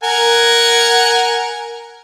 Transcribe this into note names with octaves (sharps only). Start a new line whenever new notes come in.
A#4 F#5 G#5